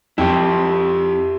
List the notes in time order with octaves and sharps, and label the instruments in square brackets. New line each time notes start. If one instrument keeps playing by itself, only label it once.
[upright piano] F2 [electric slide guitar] E4 G4